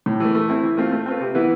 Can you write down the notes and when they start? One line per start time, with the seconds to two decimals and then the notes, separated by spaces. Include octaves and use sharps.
0.06 A2
0.20 E3 A3
0.35 A3
0.49 C4 E4
0.63 E3
0.77 A3 C4 F4
0.92 A3
1.06 C4 F4 B4
1.21 C3
1.35 E3 B3 E4 B4